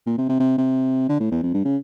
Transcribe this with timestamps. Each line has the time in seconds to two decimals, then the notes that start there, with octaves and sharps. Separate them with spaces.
0.06 A#2
0.18 C3
0.29 C3
0.40 C3
0.58 C3
1.09 D3
1.20 A2
1.31 E2
1.43 F2
1.54 G2
1.65 C#3